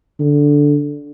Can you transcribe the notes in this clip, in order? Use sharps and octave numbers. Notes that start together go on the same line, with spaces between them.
D3